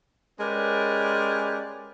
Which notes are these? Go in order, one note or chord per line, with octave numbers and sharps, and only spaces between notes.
G#3 C#4 G4 A#4 B4 D5